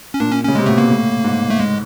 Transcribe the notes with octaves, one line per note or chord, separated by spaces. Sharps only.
C#4
A#2 D4
C#4
C#3 C#4
C3 G#3
B2 A3
A#2 A#3
A2
G#2
A3
G#3